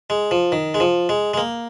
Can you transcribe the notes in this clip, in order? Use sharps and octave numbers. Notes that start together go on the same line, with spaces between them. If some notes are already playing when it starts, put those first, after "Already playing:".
G#3
F3
D#3
G#3
F3
G#3
G#3
A#3